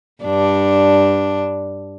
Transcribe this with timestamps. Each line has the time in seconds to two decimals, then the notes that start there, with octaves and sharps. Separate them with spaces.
0.23 G2 D4